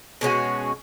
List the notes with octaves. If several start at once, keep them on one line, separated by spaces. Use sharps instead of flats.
B2 G#3 C#4 F#4